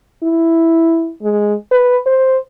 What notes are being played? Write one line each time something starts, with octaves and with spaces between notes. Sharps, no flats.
E4
G#3
B4
C5